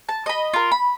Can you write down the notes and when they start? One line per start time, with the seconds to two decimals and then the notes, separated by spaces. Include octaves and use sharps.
0.09 A5
0.26 D#5 B5
0.54 F4 A#4
0.72 B5